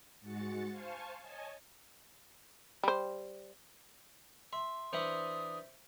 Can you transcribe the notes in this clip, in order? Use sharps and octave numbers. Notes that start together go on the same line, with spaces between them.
G#2 G#3 F#4 A6 C#7
C5 F5 G#5 A5 C#6
C#5 D#5 G#5 A5
G3 C5
E5 C6
E3 D4 C5 D5 E5 D#6